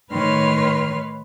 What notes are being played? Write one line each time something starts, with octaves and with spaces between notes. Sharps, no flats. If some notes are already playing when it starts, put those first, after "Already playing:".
A2 D#3 B4 C#5 C6 F6